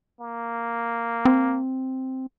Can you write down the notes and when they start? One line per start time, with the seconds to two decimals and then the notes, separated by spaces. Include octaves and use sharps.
0.20 A#3
1.25 C4